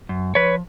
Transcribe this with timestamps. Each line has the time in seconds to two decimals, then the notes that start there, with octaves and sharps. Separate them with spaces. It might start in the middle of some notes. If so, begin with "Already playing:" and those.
0.09 F#2
0.35 F3 B4 C#5